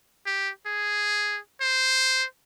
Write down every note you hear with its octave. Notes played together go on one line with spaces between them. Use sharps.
G4
G#4
C5